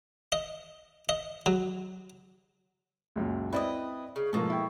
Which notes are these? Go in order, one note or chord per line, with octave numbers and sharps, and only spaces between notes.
D#5
D#5
F#3
C#2 F#2 A#2
C4 E4 B4 C5 D5 D#5
C#3
G#2 B2 F3 A#3 A4
E4 G5